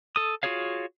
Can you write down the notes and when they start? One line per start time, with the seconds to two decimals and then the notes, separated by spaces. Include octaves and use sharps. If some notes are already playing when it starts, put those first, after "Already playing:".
0.16 A4 D#6
0.43 F4 F#4 G#4 C#5 F5